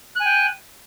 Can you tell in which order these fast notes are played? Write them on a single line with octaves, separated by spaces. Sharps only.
F#6 G#5 G5